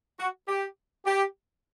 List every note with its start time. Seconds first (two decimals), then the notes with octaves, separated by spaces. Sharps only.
0.20 F#4
0.48 G4
1.06 G4